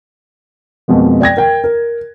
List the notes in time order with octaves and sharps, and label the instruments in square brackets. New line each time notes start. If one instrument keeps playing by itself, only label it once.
[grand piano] F2 B2 G#3 A#3
D5 G5 G#6 A#6
A#4 G5
A#4